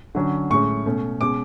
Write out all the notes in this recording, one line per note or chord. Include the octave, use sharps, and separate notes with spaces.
D3 F#3 C#4
A2 G#3 C#4 C#6
B2 A3 C#4
B2 G#3 C#4 D6